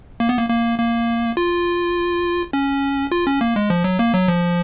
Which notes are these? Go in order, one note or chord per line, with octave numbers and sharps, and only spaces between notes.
A#3
B3
A#3
A#3
A#3
F4
C#4
F4
C#4
A#3
G#3
F3
F#3
A#3
F#3
F3